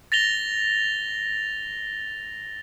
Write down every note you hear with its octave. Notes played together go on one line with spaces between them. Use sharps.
A6 A#6 F7 G7